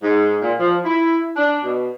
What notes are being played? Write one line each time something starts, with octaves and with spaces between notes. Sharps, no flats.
G#2
A#2
F3
E4
D4
B2